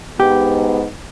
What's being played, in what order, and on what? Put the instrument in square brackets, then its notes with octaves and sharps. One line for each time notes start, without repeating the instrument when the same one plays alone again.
[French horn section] G#2 B3 [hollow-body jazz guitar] G4